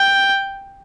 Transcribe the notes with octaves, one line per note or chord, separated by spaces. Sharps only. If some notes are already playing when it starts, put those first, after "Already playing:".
Already playing: G5